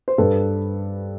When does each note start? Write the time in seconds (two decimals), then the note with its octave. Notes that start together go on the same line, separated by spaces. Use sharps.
0.08 C5
0.18 G2 A4 B4